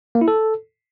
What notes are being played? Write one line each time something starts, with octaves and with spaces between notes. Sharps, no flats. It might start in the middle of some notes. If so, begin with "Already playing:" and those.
A#3
E4
A4